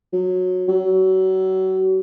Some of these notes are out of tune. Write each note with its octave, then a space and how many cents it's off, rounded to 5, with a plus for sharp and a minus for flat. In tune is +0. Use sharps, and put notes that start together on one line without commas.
F#3 -15
F#3 +30